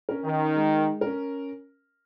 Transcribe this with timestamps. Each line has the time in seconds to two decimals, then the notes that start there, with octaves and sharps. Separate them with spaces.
0.09 C#4 A#4
0.24 D#3
0.56 G#3
1.01 A#4
1.06 C#4